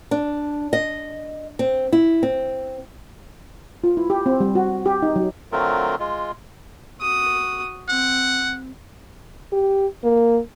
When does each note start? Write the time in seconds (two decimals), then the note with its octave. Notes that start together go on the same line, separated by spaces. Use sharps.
0.11 D4
0.73 D#5
1.59 C4
1.92 E4
2.23 C4
3.84 F4
3.97 E4
4.10 G4
4.26 C4
4.40 G3
4.55 F#4
4.86 G4
5.02 D#4
5.16 F#3
5.52 D3 F#3 A3 C4 F4 A#4
5.99 G#3 F4
7.01 F#4 D#6
7.89 C4 F#5
9.52 G4
10.04 A#3